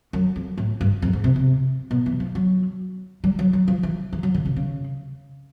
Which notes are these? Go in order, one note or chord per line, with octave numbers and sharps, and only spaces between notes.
F#2
F2
A2
G2
F2
G#2
C3
C3
B2
E3
F3
F#3
G3
F#3
F#3
F3
E3
E3
F#3
D3
C#3
C#3